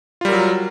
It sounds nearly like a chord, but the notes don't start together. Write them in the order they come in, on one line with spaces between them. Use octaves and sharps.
F4 G3 A#4 F#3